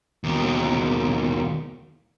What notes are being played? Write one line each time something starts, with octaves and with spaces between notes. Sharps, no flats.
D#2 B2